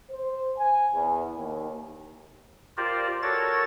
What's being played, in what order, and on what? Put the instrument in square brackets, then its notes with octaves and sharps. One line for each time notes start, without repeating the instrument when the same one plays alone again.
[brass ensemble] C5
G#5
E2
D#2
[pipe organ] F4 G4 A#4 C5 D5
F#4 A4 A#4 C#5 A6